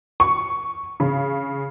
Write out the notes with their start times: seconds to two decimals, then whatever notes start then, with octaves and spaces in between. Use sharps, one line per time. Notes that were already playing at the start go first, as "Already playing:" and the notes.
0.20 C#6
1.00 C#3